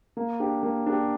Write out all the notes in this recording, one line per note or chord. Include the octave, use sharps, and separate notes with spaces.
A#3
D4 G4
A#3
D4 G4